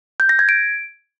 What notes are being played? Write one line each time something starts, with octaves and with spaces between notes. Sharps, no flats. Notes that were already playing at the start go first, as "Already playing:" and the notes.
G6
A#6
G#6
D7